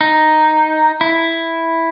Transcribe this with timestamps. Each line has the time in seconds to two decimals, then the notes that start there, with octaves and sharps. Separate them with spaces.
0.01 D#4
1.01 E4